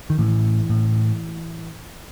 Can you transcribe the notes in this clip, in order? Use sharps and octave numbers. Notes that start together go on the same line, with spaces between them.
D#3
A2 E3
A2